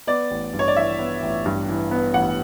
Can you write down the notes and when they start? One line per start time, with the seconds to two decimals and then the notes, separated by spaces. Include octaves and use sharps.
0.07 B3 D5
0.31 A1
0.53 G2
0.59 C#5
0.68 D5
0.76 E3 E5
0.99 B3
1.22 A1
1.46 G2
1.68 E3
1.91 B3
2.14 A1 F#5